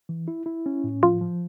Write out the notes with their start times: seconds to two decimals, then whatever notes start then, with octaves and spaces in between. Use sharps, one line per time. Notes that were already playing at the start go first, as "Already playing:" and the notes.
0.09 E3
0.28 E4
0.46 E4
0.66 C#4
0.84 A2
1.03 F3 F4
1.21 F3